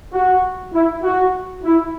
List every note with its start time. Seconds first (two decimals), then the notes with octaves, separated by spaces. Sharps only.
0.12 F#4
0.73 E4
1.02 F#4
1.63 E4